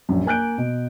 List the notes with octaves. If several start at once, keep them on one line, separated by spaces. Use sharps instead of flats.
A#1 F#2
A#3 G#5 F#6 G6 D7
B2